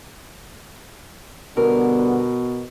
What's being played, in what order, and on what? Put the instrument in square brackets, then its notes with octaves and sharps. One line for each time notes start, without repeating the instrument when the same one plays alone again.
[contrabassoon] B2 [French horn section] D3 G3 B3 [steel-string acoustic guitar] A#4